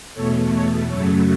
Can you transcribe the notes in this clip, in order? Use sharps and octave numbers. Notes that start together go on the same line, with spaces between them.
E2 B2 A3 A4 C#5
A4 C#5
F#2 C#3 F#3 A3 A4 C#5